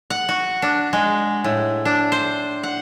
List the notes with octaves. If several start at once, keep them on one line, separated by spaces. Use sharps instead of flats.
F#5
F#4
D4
G#3
A2
D4
C5
F#5